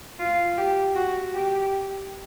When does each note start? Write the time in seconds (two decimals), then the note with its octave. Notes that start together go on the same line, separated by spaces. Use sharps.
0.19 F4
0.57 G4
0.95 F#4
1.33 G4